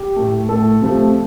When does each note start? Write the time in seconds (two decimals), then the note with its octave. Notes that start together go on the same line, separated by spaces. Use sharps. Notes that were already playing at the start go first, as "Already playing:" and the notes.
Already playing: G4
0.16 A2 A3
0.48 A2 A3 A4
0.81 C3 F3 A3